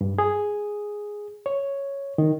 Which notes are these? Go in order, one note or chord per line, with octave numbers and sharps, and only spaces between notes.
G2
G#4
C#5
D#3